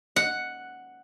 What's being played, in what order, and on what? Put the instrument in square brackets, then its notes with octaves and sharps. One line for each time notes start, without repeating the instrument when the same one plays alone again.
[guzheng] F#5